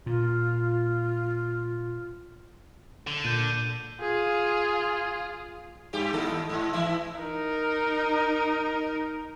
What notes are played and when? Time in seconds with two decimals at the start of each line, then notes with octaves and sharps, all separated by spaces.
0.06 A#2 F4
3.07 D3
3.25 A#2 G6 D#7
4.00 F4 G#4
5.93 G2 G4
6.13 D#2 A4
6.49 G#2
6.73 E3 E4
7.18 D#4 A#4